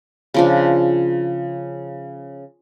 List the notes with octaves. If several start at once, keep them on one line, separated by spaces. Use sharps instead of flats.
C#3 F3 D4